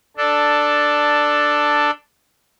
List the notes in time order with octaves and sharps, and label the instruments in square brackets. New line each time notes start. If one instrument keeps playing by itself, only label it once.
[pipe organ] D4 A4